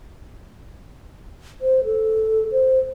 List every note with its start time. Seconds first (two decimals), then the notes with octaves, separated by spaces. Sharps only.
1.61 C5
1.85 A4
2.52 C5